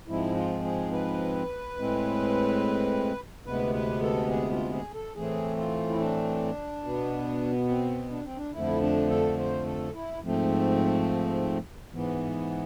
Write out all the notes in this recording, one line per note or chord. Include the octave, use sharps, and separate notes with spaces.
G#2 F3 G#3 C4 E4
F4
G#4
B4
A2 G#3 C4
D2 C3 G#3 B3 B4
B4
A4
G#4
F4
G#4
A4
A2 E3 A3 C4 G#4
F4
E4
D4
B2 B3
C4
D4
C4
D4
F2 D3 F3 A3 E4
D4
A4
C5
A4
E4
G#2 F3 A3 C4
G#2 E3 B3